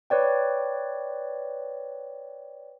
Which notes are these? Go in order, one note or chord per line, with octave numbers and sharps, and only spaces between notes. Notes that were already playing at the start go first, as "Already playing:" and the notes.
B4 C#5 D5 G5